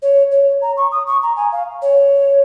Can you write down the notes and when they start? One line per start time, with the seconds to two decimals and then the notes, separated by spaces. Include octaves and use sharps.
0.02 C#5
0.31 C#5
0.62 A#5
0.77 C#6
0.92 D#6
1.07 C#6
1.22 A#5
1.36 G#5
1.52 F5
1.82 C#5